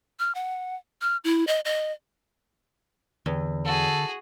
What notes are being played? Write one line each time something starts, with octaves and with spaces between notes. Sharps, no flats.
F6
F#5
F6
E4
D#5
D#5
E2 D3
F#4 G#4 A4